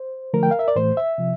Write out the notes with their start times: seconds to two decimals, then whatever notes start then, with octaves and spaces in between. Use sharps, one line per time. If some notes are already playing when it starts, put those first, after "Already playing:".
Already playing: C5
0.33 D3 F3 A3 A#4
0.43 G5
0.51 F5
0.59 E5
0.68 D5
0.76 A2 E3 A3 C5
0.97 E5
1.18 C3 F3